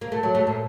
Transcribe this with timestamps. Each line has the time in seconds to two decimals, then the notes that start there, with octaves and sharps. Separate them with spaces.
0.01 A#3
0.12 A3
0.23 F#3
0.35 A3
0.47 A#2